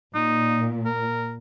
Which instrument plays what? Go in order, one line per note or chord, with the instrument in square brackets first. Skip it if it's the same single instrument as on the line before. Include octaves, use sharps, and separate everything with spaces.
[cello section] A#2 [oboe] D#4
[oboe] A#4